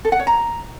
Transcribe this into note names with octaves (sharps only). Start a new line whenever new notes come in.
A4
F#5
C#5
A#5